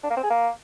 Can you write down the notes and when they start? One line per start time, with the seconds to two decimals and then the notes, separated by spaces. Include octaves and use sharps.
0.04 D4
0.10 A#3
0.17 C4
0.24 G#4
0.30 A#3